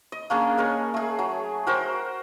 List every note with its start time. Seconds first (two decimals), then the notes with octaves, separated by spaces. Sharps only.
0.12 D#5
0.30 A#3 C#4 D4 G#4
0.58 G#3 A#4 C#5
0.94 A3 G#4
1.19 F#3
1.67 F#4 A#4 C5 G5